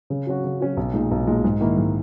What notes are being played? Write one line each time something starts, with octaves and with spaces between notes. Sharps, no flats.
C#3
F#3 C#4 F#4
C#3
F#3 C#4 F#4
B1
A#2 G#3 D#4
B1
A#2 G#3 D#4
G#2
D#3 A#3 E4
G#2